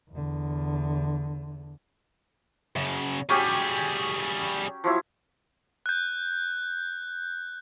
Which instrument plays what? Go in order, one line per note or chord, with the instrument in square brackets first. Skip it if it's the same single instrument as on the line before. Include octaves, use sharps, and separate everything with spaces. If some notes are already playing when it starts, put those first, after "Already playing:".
[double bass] E2 D3
[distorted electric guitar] F#2 C#3
[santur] F#3 C#4 G4 [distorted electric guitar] G3 G#4
[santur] F3 F#3 E4
[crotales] F#6 G6